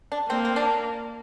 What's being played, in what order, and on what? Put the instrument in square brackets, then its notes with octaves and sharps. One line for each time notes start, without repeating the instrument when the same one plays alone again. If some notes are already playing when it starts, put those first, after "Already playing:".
[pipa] D4
[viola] A#3 [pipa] C4
[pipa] C4
D4